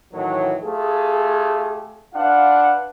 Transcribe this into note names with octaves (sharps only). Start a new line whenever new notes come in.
A2 D#3 E3 F#3
A3 F4 G4 G#4
D4 F4 B4 F5 F#5